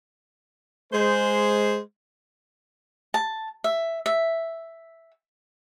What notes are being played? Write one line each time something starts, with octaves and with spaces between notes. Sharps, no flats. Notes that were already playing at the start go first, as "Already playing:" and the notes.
G#3 C5
A5
E5
E5